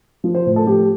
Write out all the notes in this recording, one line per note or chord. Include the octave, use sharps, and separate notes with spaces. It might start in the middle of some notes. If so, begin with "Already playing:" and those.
F3
C5
A2
A4
F3 G4